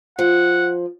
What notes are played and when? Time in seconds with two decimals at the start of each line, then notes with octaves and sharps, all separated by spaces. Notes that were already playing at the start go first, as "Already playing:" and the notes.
0.19 F3 F#5